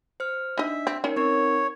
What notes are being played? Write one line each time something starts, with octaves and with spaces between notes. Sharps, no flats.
C5 F6
D4 D#4 D#5 E5
C4
C#4 D#4 A#4 C#5
C4 D#4 A#4 C#5